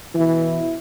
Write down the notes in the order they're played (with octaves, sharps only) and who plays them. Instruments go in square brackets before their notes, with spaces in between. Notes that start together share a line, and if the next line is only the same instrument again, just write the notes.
[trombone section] B2 E4 [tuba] E3